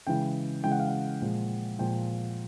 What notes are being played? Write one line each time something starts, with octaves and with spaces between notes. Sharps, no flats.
C#3 E3 G#3 G5
C#3 E3 G#3 G5
F#5
F5
F#5
A#2 F3 G#3
A#2 F3 G#3 G5